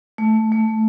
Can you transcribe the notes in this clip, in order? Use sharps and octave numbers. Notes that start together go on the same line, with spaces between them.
A3
A3